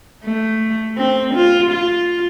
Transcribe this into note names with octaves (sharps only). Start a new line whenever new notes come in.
A3
C4
F4
F4